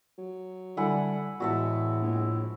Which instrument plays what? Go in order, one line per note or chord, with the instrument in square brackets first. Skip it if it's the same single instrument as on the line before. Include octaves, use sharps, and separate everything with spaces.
[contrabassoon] F#3
[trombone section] D3 [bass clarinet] G3 [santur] E4 F#5 G#5
[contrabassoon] E2 [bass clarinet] A2 [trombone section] G#3 [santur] F#4 E5 A5
[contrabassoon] A#1